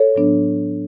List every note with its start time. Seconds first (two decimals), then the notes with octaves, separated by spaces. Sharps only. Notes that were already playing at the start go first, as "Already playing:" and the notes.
Already playing: A4 C#5
0.15 A2 F#3 B3 D4